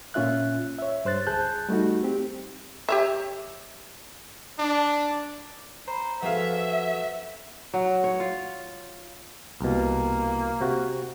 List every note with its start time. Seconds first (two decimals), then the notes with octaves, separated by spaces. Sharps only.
0.14 A#2 C#4 F4 E5 F#6
0.79 C#5 E5
1.05 G2 C5 F#6 A6
1.27 C#2 G#4 A5 F#6 G6
1.69 G3 A3 D#4 F#4
2.03 C4 G4
2.89 G4 C#5 E5
4.59 D4
5.87 C5 A#5 B5
6.22 F3 F#4 G#4 A4 B4 E5 F5
7.74 F#3
8.04 C#5
8.20 F4
9.61 C2 B2 A#3
10.61 C3 F#4